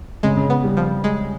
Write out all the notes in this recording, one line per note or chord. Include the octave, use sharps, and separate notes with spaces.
C#3 G#3
C#3
B3
G3
F3
G#3